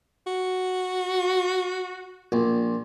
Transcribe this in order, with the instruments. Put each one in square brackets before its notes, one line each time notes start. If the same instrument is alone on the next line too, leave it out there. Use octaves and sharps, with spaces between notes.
[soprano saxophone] F#4
[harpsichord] A#1